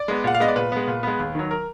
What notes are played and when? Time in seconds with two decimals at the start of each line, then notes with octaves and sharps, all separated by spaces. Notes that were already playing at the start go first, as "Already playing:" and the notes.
Already playing: D5
0.08 G#3 B3
0.24 A#2 F#5
0.35 F5
0.40 G#3 B3 D#5
0.48 D5
0.56 A#2 B4
0.72 G#3 B3
0.87 A#2
1.03 G#3 B3
1.19 D#2
1.35 D#3 F#3
1.51 A#4